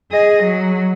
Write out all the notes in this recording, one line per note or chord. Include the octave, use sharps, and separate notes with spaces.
G#4 D#5
F#3